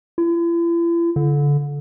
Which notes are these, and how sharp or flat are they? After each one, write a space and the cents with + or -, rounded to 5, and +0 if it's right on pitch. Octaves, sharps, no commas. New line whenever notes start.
E4 +45
D3 -25